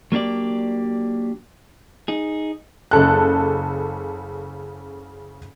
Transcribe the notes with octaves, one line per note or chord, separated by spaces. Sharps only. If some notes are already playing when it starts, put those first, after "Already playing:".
F#3 A#3 D4 G4 D5
D#4 G#4
F#1 C#3 A4 F#6